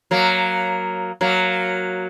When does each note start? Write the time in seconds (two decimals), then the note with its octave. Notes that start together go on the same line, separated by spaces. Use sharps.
0.11 F#3 A#3
1.21 F#3 A#3